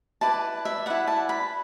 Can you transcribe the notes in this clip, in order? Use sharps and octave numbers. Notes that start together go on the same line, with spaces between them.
E4 B4 D5 A5
E5
E4 B4 D5 F#5
A5
B5